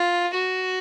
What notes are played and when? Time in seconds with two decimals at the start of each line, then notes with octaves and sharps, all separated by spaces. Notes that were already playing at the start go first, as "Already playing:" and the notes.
Already playing: F4
0.34 F#4